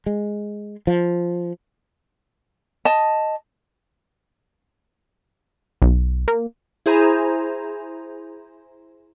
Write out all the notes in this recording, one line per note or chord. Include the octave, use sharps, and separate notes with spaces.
G#3
F3
D#5 A5
B1
A#3
E4 G#4 C5 G#5 A#5